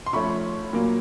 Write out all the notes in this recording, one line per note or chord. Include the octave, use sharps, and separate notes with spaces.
C6
F3 A3 C#4 B5 C#6
A#2 F#3 A#3